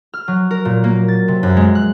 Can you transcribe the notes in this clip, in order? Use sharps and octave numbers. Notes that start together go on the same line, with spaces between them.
F6
F#3
A#4
A#2
A#3
A6
C3
F#2
G#3
F#6